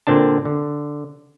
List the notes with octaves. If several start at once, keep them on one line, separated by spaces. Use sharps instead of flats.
A#2 D3 C4 D4 A5
D3